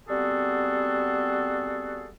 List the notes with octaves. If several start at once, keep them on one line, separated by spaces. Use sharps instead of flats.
G3 B3 C4 F#4 G#4 A4